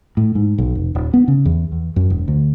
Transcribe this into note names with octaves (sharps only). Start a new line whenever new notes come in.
A2
G#2
B1
F1
D#1
B3
C#3
E2
E2
F#2
E1
D2